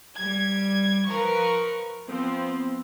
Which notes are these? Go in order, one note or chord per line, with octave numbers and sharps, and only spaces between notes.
G3 G#6
F3 A#4 B4 C#6
F3 B3 C4